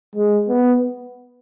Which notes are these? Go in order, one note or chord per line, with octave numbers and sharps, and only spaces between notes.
G#3
B3